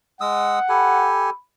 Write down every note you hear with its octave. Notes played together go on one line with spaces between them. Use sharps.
G#3 F#5 D#6 E6
G4 A4 G#5 B5